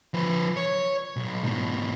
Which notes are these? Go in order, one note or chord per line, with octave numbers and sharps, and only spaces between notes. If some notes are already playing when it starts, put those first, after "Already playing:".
F3 B4
C#5
B1
G#2 B2